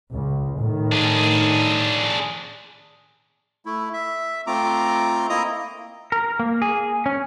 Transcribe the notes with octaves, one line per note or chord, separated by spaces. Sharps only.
C#2
A2 D#3
D4 G#4
A3 E4
E5
A3 C4 F4 A#5 D6
A#3 E4 D#5 A#5 D#6
A#4
A#3
G#4
C#4